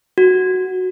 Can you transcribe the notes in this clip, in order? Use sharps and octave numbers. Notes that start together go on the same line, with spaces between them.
F#4